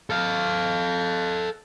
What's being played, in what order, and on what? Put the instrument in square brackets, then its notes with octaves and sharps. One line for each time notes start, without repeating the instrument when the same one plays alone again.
[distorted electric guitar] A4 F5